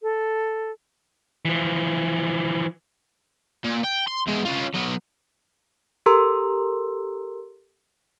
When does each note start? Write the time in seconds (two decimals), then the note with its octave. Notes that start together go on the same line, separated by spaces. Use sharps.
0.02 A4
1.45 E3 F3
3.65 A#2
3.84 G5
4.07 C6
4.27 E2 G#3
4.45 C#4 F4
4.74 F#3 B3
6.06 G4 A4 A#4 A#5 C6 E6